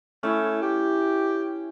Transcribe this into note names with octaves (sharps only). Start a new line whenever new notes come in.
A3 C#4 E4
G4